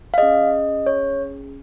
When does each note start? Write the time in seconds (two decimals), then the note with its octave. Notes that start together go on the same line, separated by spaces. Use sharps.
0.14 F5
0.18 C#4 G#4 D#5
0.86 C#5